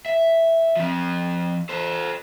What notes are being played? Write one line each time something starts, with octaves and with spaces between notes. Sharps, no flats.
E5
F3 C4
A4 C5